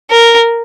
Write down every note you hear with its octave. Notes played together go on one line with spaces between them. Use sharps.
A#4